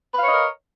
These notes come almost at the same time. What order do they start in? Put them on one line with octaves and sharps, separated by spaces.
B4 F5 C#5 D#5 A#4